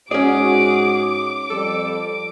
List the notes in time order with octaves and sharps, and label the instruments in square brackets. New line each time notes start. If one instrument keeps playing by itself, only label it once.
[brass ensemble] G#2 F#4 [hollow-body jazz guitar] C#4 D5 [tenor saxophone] G#4 [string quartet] D6
[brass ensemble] F2 G3 [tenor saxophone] A4